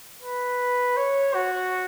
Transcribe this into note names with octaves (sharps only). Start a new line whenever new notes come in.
B4
C#5
F#4